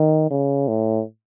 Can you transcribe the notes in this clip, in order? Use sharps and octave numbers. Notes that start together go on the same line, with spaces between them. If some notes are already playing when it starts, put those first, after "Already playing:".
Already playing: D#3
C#3
A2